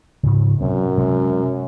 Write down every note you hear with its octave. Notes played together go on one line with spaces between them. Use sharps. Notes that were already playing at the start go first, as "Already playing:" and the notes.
G#2 C#3
F#2 C3 F#3 C4
C3 F#3 G#3